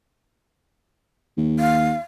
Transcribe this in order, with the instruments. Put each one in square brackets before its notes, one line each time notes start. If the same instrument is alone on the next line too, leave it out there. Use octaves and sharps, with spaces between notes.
[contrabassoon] D#2
[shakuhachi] F5